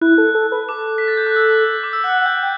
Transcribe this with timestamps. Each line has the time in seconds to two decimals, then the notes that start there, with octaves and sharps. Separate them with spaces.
0.01 E4 F#6
0.18 A4
0.35 A4
0.52 B4
0.69 A4 D6
0.98 B6
1.08 A6
1.17 G6
1.27 F#6
1.36 E6
1.84 D6
1.93 E6
2.04 F#5 F#6
2.22 F#5
2.26 G5 G6
2.42 G5